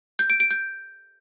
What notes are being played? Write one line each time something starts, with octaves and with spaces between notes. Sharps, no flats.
G6
D7
D7
G6